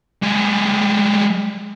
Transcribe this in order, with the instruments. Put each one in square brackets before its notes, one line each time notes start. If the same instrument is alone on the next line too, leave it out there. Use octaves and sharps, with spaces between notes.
[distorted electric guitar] G3 G#3